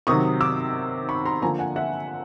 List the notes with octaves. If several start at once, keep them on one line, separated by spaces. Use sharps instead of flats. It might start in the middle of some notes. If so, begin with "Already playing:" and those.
C3 D#3 F#3 C#6 D#6
D6 E6
B5 C#6
A#5 C6
D3 F3 A#3 G#5 A#5
F#5 G#5
E5 F#5